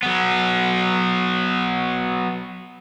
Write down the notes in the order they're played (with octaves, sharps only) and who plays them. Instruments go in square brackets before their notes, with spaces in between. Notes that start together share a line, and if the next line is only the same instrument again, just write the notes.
[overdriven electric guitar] F#3 B3